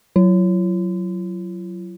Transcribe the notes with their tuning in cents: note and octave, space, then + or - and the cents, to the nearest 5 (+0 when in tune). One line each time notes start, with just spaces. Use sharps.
F#3 +0 F4 -45